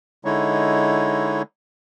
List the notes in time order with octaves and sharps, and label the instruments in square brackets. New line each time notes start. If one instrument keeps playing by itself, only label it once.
[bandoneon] D3 G#3 D#4 E4 C#5